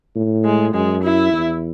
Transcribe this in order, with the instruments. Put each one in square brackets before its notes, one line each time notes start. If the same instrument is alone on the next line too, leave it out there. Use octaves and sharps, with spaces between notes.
[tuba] A2
[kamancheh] G#3
[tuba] F#2 [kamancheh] G#3
[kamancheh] E4
[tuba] E2